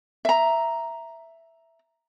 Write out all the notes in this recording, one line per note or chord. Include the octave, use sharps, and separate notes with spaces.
E5 A#5